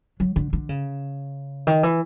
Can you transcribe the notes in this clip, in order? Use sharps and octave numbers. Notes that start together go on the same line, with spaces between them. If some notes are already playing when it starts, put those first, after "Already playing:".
F#3
D3
D3
C#3
D#3
E3